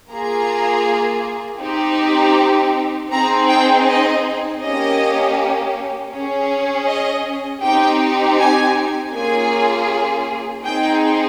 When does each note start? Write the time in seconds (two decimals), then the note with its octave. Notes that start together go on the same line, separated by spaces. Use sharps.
0.11 A#3 F4 G#4 A#5
1.62 C4 D#4 G4
3.11 C4 D#4 G#4 A#5
3.50 G5
3.87 D#5
4.63 A#3 C#4 G4 D#5
6.13 C#4 G#4
6.88 D#5
7.63 C4 D#4 G4 G5
8.39 G#5
9.13 A#3 C#4 F4 G#4 G#5
10.64 C4 D#4 G#4 G5